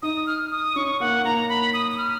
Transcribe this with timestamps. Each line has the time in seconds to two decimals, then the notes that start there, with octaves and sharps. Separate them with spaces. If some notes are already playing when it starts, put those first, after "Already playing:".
0.02 D#4 D#6
0.27 F6
0.51 D#6
0.76 C#4 C#6
1.00 A#3 F#5
1.24 A#3 A#5
1.49 B5
1.73 D#6
1.91 D#6
1.98 F6